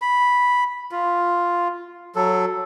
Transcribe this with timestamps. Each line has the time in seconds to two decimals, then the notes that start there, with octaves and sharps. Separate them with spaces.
0.02 B5
0.92 F4
2.16 F#3 A4